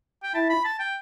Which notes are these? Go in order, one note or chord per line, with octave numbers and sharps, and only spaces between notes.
G5
E4 E5 A5
B5
A5
G5